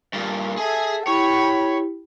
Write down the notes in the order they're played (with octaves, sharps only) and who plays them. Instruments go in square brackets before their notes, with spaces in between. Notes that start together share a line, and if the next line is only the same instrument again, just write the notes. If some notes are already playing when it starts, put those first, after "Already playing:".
[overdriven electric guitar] G2 A#2
[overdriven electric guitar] G#4 G#5 [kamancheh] A4 E5
[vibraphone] E4 G4 [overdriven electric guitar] C#5 [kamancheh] G5 B5